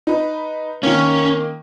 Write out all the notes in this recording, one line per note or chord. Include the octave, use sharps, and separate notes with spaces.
D#4 B4
D#3 A#3 C#4